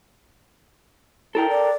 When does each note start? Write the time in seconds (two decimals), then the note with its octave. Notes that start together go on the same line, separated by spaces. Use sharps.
1.35 E4 A4 A#4 G5
1.50 D5